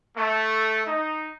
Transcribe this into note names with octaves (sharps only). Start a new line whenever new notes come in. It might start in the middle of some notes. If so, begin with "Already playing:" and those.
A3
D#4